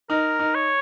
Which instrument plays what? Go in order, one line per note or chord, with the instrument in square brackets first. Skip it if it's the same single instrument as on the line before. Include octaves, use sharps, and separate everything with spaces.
[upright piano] D#4 [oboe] A#4
[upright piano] D#4
[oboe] C#5